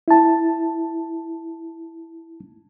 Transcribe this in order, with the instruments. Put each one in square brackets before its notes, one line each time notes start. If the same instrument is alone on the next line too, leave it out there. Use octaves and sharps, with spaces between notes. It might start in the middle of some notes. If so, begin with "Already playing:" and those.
[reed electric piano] E4 A5